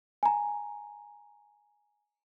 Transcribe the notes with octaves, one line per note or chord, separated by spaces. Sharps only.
G#5 A#5